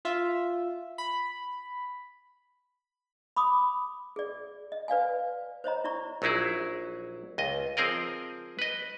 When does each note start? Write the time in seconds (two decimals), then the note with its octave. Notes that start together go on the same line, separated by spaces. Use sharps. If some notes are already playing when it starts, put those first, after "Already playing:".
0.05 F4 E5
0.98 B5
3.36 B5 D6 D#6
4.16 G#4 D5
4.72 D#5
4.88 B4 D5 F5 G#5
5.64 C5 C#5 D#5 A#5
5.84 E4 D5 A#5 C#6
6.22 A#1 F#3 D#4 E4 G#4
7.38 C#2 D#5
7.77 F3 C4 G#4 A#4 D#5
8.59 B4 D#5